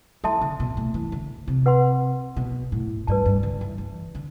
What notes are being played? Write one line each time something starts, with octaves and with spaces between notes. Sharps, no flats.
E3 A4 E5 A5 C6
D3
B2
A2
E3
D3
C3
B4 F#5 C6
B2
A2
G2 B4 D5 A5
G2
D3
E3
E3
D3